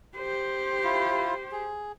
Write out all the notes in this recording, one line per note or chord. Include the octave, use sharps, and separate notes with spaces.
G4 C5
E4 F4
G#4